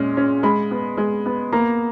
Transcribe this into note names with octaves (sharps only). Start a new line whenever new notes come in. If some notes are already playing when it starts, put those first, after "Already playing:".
Already playing: A#2 G#3 C#4
C#4
G#3 B5
B3
G#3
B3
A#3 A#5